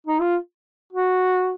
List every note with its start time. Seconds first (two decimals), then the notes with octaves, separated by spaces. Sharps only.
0.07 D#4
0.21 F4
0.93 F#4